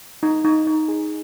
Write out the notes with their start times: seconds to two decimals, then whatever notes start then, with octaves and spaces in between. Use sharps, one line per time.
0.23 D#4
0.45 D#4
0.67 D#4
0.88 G#4